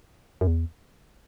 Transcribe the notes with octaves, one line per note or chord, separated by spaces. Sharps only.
F#2
E2